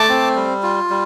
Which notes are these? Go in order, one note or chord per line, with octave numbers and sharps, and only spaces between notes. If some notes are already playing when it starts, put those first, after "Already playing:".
Already playing: A3 A5 D6
C4
G3
F4
G3